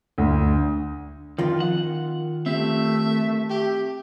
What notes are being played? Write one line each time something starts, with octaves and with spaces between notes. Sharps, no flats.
D2
F2 D#3 F4
F#5
A3 C4 G4 E5
G4